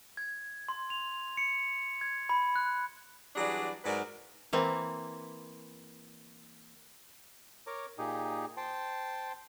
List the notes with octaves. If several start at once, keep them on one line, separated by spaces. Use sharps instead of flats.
G#6
C6
F7
C#7
G#6
B5
F#6
E3 F#3 G3 D4 G#4 D5
G#2 F#3 A#4 B4 D5
E3 A#3 C4
A#4 C#5 A#5 D6
A#2 D#4 G4 G#4
C5 G5 A5 C6